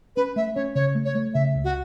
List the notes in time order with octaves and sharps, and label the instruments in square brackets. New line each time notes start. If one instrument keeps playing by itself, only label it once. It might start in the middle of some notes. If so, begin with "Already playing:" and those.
[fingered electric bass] C#4 [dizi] B4
[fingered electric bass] A3 [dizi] E5
[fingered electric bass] C#4 [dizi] C#5
[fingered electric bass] C#3 [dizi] C#5
[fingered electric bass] A3
[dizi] C#5
[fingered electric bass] A3
[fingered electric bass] C#3 [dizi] E5
[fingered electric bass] C#2
[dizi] F#4